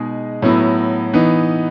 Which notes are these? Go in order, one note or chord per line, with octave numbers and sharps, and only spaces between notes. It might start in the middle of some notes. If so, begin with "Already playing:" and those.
Already playing: B2 G#3 D#4 G#4
A2 F#3 B3 E4
E3 B3 D#4